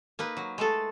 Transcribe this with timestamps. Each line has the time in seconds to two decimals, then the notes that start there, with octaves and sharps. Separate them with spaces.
0.19 A#3 D#4 B4
0.37 F#3
0.58 G#3 A3 A4